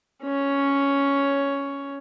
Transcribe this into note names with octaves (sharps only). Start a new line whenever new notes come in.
C#4 C#5